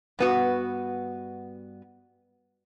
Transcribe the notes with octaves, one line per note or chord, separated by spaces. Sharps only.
G2 B3 F#4